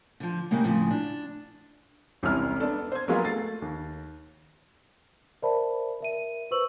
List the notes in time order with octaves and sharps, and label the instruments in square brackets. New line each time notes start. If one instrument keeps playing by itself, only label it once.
[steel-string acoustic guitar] D3 F3
C#3 G3 G#3 A#3
F2 A2 C#3 F3
D4
[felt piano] E1 C2 C3 C#4 E4 F6
B3 D4 A4
C5 G#6
F#3 G#3 A#3 B3 F4
A3 A6 C7
D#2
[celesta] A#4 C5 D5 E5 A5 B5
A#4 E5 D#7
B4 C5 C#6 E6 F#7